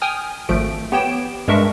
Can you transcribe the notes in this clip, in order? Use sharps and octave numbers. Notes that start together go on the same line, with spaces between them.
G5 G#5 D#6 F6
G#1 F3 A3 D7
B3 G4 C#5 G5 D7 E7
G2 G#3 D4 A#4 E5 C#6